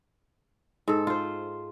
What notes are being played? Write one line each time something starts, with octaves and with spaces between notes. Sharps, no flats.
G#2 A4
F4 C5